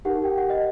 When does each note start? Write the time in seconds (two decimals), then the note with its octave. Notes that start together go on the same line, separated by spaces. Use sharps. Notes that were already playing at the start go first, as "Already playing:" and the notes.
0.05 D#4 G4 A#4 F#5
0.24 G5
0.38 F#5
0.50 D#5